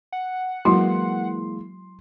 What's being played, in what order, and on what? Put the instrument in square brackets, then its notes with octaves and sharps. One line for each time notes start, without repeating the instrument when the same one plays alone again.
[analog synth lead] F#5
[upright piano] E3 G#3 A#3 [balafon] F#3 E4 F#4 [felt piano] C6